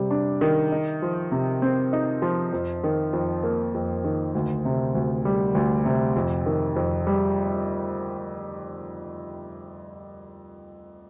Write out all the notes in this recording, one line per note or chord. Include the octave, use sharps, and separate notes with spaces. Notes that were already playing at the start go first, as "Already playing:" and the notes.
Already playing: C3 G3
D4
D#3
D#4
F3
C3
C4
D#4
F3
F2
D#3
F2
A#3
F2
D#3
D2
C3
D2
G3
D2
C3
F2
D#3
F2
G3